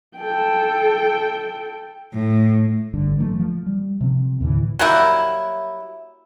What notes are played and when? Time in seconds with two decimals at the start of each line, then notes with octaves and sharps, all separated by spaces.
0.18 A4 G5
2.12 A2
2.93 G#1 G2 D3
3.18 E3 F#3 A3 A#3
3.40 F3
3.66 G3
4.01 C3 F3 C4
4.41 D#2 A2 D3 E3
4.79 F#3 G3 A#3 E4